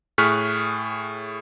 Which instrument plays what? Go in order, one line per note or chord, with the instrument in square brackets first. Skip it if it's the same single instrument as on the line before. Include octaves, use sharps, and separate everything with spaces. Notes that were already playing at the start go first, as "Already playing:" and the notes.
[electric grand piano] A2 G#4 C#6 F6 F#6 B6